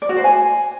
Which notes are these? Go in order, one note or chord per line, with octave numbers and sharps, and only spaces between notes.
D5
F#4
C5
G#5